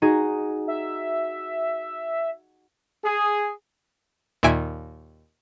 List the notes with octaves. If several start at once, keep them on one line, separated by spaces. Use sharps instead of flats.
D#4 F#4 G#4
E5
G#4
D#2 A#2 E5 G#5 D7 D#7